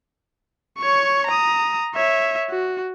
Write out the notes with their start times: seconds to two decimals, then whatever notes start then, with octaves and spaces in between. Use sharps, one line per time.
0.79 C#5 C#6
1.27 A#5 D#6
1.94 C#5 E5
2.50 F#4